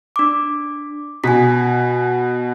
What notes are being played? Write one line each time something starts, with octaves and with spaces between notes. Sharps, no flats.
D4 D6
B2 G#5 B6